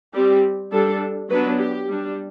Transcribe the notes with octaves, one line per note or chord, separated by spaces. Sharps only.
G3 C4 G4
G3 D4 A4
F#3 B3 D4 B4
G4
G3 D4